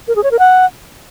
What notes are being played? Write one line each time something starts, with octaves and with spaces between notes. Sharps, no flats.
A#4
G#4
C#5
A#4
F#5